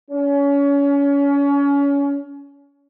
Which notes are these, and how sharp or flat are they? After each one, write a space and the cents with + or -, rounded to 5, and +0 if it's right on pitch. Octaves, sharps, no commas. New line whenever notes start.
C#4 +30